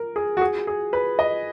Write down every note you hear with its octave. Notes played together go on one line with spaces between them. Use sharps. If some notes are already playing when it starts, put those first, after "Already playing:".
Already playing: A#4
G#4
F#4
G#4
G#4
B4
D#5